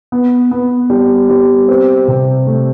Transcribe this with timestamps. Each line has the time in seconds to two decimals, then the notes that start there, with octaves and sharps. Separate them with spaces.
0.12 B3
0.51 B3
0.90 G3
1.29 G3
1.68 C4
2.08 C3
2.47 A3